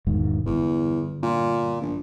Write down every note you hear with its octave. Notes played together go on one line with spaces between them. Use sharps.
E1 G#2 D#3
G1 E2
A#2
A#1